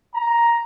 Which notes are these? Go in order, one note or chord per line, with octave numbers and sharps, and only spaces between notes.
A#5